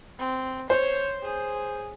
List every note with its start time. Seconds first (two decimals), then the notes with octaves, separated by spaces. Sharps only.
0.19 C4
0.70 C5 C#5
1.23 G#4